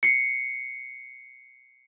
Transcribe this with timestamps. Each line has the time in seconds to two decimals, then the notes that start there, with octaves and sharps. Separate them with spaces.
0.03 C7 C#7